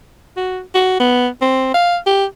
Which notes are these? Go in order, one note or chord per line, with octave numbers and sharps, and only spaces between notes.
F#4
F#4
B3
C4
F5
G4